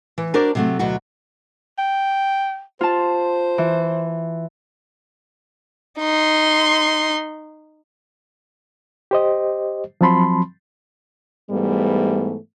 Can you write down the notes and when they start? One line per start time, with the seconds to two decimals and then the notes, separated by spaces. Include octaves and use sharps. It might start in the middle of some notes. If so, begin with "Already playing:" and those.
0.18 E3
0.34 D4 F#4 A#4 C5 D5
0.55 C3 F#3 A3
0.79 D2 B2 F#3 F#4
1.79 G5
2.81 F4 C5 A5
3.58 E3
6.00 D#4 C6
9.11 G4 C5 D#5
10.01 F3 F#3 C4 A5 B5 C6
11.50 G#2 E3 G3 A3 B3